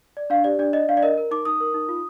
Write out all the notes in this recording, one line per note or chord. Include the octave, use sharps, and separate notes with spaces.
D5
D4 F5
G4 D5
D4 D5
D5 D#5
D4 F5
D5
A#4 D#5
A#4
D#4 D6
D#4 D#6
A#4
D#4
F4